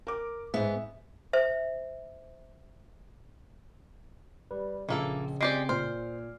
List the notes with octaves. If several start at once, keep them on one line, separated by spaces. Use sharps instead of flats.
A#4 D6
G#2 B3 E5
C5 E5
G3 B4
A#1 C#3 E3 A#3 A4
G#3 C4 G4 D5 C7 D7
A#2 C5 F6